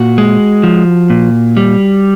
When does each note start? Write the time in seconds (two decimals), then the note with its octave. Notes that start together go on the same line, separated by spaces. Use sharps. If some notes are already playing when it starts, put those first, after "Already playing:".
Already playing: A#2 F#4
0.18 G#3
0.63 F3
1.10 A#2
1.57 G3